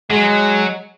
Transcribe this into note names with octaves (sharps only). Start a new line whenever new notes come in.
F#3 G#3